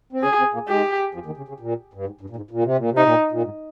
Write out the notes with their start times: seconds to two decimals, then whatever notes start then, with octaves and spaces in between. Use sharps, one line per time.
0.13 C4
0.23 C#3 C#4 G#4
0.39 C3 C4
0.53 A#2 A#3
0.68 G#2 G#3 G4
1.14 F2 F3
1.26 D#2 D#3
1.37 C#3
1.48 C#3
1.60 A#2
1.93 G2
2.06 G#2
2.21 G2
2.30 A#2
2.36 G#2
2.51 A#2
2.64 C3
2.77 A#2
2.90 C3
2.97 D#4
3.03 A#2
3.31 A#2
3.43 G#2